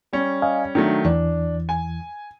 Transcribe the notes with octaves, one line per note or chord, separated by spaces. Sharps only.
G3 C#4
D#5 F5 G#5
D#3 F#3 A3 D4
E2 E3 D4
G#5